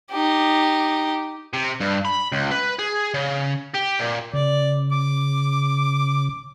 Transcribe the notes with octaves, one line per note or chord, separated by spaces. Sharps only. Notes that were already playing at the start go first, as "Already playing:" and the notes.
D#4 G4
C3
G2
B5
C#2
B4
G#4
C#3
G4
A#2
C#3 D5
D6